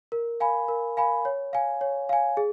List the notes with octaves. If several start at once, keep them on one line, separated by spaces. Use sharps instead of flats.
A#4
F5 G#5 B5
A#4
F5 G#5 B5
C#5
F5 G#5
C#5
F5 G#5
G#4